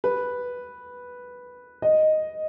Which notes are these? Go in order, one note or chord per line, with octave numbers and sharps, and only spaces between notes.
B4
D#5